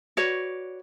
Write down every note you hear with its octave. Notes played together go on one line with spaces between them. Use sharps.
F#4 B4 C#5 D5